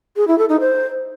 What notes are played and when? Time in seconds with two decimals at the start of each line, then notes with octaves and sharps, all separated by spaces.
0.17 G#4
0.27 E4
0.38 A4
0.49 D#4
0.60 C5